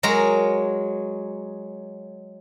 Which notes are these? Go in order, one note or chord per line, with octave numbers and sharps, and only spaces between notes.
F#3 G#3 A#4 A#5